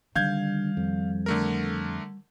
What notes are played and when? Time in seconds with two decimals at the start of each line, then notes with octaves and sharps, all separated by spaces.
0.15 D3 D#3 G3 F5 G6 G#6
0.77 F2
1.26 D3 A3 A#4